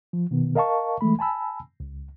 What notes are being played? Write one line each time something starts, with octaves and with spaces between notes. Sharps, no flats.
F3
B2 D#3 B3
A#4 D#5 F5 A5 C#6
E3 G#3 A3 B5
G#5 A5 B5 E6
C#2